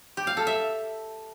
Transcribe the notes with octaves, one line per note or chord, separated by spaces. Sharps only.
G4
F5
A4
E5